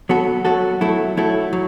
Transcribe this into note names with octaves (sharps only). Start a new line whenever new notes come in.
F#3 B3 F#4 A4
F#3 B3 F#4 A4
F#3 A3 E4 A4
F#3 A3 E4 A4
F#3